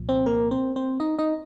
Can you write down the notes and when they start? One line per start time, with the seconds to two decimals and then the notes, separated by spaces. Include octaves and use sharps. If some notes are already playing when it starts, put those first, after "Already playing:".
Already playing: C2 A#2 F3
0.09 C4 C5
0.26 A#3 A#4
0.51 C4 C5
0.76 C4 C5
1.00 D#4 D#5
1.19 D#4 D#5